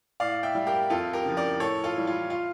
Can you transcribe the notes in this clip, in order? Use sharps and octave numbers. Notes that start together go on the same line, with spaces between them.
A2 D5 F5
E5 G5
G3
G4 A#4
F2 F4 A4
G4 A#4
C#3 F3
A#4 D5
A2 A4 C#5
F4 A4
E3 G3
F4
F4